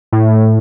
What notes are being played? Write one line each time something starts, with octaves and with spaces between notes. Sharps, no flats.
A2